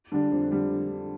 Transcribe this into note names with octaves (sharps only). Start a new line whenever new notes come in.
D3 G3 D4
F2
D3 G3 D4